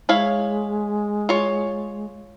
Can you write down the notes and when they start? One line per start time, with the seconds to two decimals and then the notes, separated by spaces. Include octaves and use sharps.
0.09 G#3 E4 C#5 F5
1.29 F4 C#5